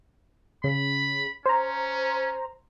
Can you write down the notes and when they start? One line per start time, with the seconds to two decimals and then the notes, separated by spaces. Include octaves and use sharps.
0.64 C#3 B5
1.46 C#4 C5 A#5